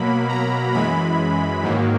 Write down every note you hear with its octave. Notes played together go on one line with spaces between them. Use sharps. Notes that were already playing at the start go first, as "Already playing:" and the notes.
Already playing: B2 F#3 A#3 B5
A#5
F#2 E3 G#3 B5
G#2 D#3 F#3 A#3